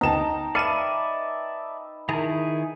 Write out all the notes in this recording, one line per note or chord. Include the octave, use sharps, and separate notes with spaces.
D2 B3 D#4 G5 A5 A#5 E7
B4 D5 E5 F5 A5 C#7 D#7 E7
D#3 E4 G#4 A#4 A5 A#5